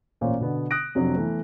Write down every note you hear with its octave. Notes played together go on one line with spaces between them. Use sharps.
A1 A#2 A#3 C5 C#5
B2 D3 B3
D#6 F#6 A#6 D7
F2 C3 F#3 D4
E3 A3 B3